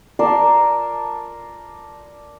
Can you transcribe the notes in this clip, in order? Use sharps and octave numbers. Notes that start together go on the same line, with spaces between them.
A#4 D5 A5 C6